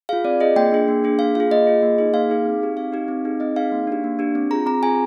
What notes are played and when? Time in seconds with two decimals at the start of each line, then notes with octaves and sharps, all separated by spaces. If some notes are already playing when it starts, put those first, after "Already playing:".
0.09 F4 G#4 F5
0.24 C4 D5
0.40 F4 G#4 D#5
0.56 A#3 G5
0.72 D4 G#4
0.88 A#3
1.04 D4 G#4
1.19 A#3 F5
1.35 F4 G#4 F5
1.51 A#3 D#5
1.67 F4 G#4
1.82 A#3
1.98 D#4 G#4
2.14 A#3 F5
2.30 D#4 G#4
2.46 C4
2.62 D#4 G4
2.77 C4 F5
2.92 D#4 G4
3.08 C4
3.25 D#4 G#4
3.40 C4 D#5
3.56 D#4 G#4 F5
3.72 A#3
3.87 D4 G4
4.04 A#3
4.19 D4 G4
4.35 C4
4.51 F4 G#4 A#5
4.66 C4 A#5
4.82 F4 G#4 G#5